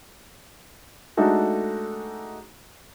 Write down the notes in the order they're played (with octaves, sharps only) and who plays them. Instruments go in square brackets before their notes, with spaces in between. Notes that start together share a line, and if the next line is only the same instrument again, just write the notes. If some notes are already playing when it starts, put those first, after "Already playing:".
[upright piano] G#3 A3 D4 D#4 F#4 A4